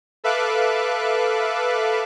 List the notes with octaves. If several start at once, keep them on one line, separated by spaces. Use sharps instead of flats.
A4 B4 E5 F5 D6 F#6